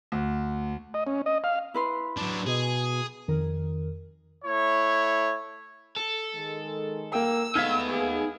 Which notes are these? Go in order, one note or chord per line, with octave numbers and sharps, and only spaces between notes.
D2
D#5
C#4
D#5
F5
E4 B4 C6
F#3 D4
B2 G#4
F2 D#3 A#4
A3 E4 C#5
A4
D#3 G#3
A#3 G5 E6
G#3 A3 B3 D#4 F5 F6 G#6 B6
G#4